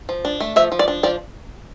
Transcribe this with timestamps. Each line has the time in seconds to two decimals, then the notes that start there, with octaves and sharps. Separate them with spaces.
0.09 F3
0.25 D4
0.40 A3
0.56 F3 E5
0.72 F3
0.79 D5
0.88 D4
1.03 F3 D5